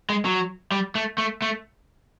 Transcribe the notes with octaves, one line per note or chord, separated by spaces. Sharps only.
G#3
F#3
G3
A3
A3
A3